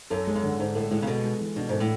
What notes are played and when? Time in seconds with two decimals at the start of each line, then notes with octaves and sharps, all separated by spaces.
0.10 F#2 A4
0.27 G#3
0.35 F#2
0.43 D3
0.59 G#2 D4
0.75 A2 A4
0.91 A2 G#3
1.02 C#3
1.07 B2 A4
1.23 G#3
1.41 E3
1.56 B2 D4
1.69 G#2 A4
1.80 A2